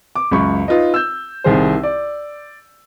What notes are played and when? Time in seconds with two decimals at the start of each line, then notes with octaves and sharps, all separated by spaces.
0.15 D6
0.31 C#2 F#2 B5 C#6
0.68 D#4 F4 B4 D#5
0.94 E6 G6
1.44 C2 D#3 G#4 C5
1.84 D5